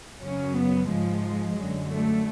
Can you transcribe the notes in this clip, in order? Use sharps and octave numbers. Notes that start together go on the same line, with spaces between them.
F#2 C#3 F#3 C#4
B3
G#2 F3 G#3
F#2 D3 F#3
A3